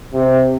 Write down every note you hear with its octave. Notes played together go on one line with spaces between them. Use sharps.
C3